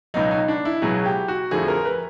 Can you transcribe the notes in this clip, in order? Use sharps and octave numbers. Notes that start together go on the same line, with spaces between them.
C#2 B2 F#3 D#4
D#4
D4
E4
C#2 B2 F#3 G#4
G4
F#4
F2 D3 F3 A3 G#4
A#4
B4